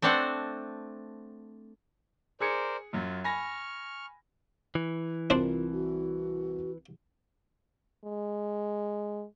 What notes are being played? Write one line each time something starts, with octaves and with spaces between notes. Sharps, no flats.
A3 C4 D4 C5 F#5
G#4 A#4 C5 D5 G#6 C#7
F#2 F#3 F4
G#5 B5 C#6 F6 A#6
E3
C2 D4 F4 A#4 C5 D5
F#4
G#3